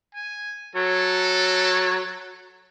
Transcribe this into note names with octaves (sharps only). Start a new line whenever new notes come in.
G#5
F#3 A4